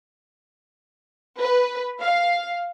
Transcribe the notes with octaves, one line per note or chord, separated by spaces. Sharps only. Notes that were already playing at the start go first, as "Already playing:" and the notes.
B4
F5